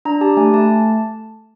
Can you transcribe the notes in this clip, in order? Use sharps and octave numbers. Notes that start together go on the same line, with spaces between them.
D4 A#5
G4 A5
A3 G#5
A3 A5